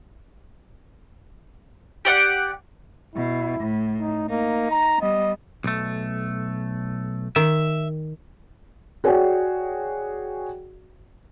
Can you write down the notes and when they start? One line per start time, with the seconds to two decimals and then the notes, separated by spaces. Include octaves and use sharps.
2.05 G4 D5 F#5
3.16 B2 E4
3.60 A2
4.00 D#4
4.29 A#3 D#4
4.72 A#5
5.02 G3 B3 D#5
5.64 B1 A3
7.36 D#3 E5
9.04 F#4 G#4 C#5 D5 F#5 G5